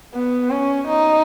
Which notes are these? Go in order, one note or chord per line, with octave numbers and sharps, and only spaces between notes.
B3
C#4
D#4